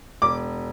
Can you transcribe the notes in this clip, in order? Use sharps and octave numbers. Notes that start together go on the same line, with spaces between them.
E1 D6